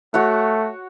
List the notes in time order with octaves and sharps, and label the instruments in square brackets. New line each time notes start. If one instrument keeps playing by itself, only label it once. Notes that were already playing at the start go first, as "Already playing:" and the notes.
[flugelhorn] A3 [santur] F#4 C#5 F#5